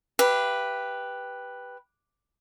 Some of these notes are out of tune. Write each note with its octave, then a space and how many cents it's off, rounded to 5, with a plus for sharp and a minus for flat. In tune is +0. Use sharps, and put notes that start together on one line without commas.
G4 +0 B4 +0 F5 -45